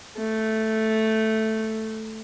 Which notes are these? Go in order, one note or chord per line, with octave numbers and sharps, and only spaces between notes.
A3